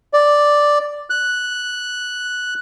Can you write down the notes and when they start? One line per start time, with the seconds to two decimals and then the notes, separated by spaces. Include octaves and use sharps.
0.13 D5
1.10 F#6